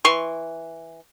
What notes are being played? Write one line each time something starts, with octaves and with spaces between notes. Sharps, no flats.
E3 C6 C#6